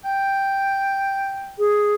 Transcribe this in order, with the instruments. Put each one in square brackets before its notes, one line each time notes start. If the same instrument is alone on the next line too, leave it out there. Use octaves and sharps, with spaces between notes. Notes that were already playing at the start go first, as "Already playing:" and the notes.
[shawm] G5
[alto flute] G#4